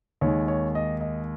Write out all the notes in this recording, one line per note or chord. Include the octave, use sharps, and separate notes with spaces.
D#2 D#3 G#3 C#5
C#5
D#5
D#5